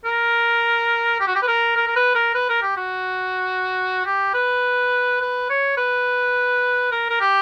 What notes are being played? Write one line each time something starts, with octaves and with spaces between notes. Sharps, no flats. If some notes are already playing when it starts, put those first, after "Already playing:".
A#4
G4
F#4
G4
B4
A#4
A#4
A#4
B4
A#4
B4
A#4
G4
F#4
G4
B4
B4
C#5
B4
A#4
A#4
G4